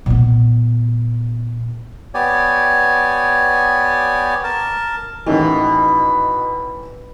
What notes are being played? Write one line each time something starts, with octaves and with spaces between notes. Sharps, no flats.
A#2 B3
B3 G4 C#5 D5 G#5
A#4 A5
A1 B2 D#3 E3